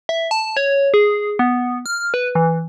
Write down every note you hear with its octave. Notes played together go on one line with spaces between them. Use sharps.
E5
A5
C#5
G#4
B3
F6
B4
E3